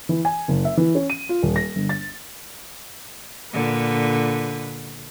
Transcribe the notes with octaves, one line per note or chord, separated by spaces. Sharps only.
E3
G#5
F#1
E5
E3
C#4
D#7
F4
D#1
A#6
G1
A6
A#2 D3 B4